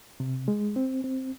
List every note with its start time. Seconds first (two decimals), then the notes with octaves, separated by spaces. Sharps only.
0.20 C3
0.48 G#3
0.76 C4
1.04 C4